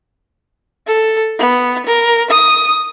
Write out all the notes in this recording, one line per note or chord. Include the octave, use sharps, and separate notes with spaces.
A4
B3
A#4
D#6